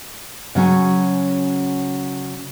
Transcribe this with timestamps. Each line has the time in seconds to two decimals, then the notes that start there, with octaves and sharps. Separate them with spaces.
0.55 C#3 F#3 C#4 G#5